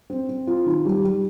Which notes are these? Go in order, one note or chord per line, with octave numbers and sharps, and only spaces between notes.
C4
C4
F4
D#3
G3
G3